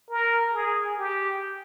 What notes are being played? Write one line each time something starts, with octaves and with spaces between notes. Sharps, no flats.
A#4
G#4
G4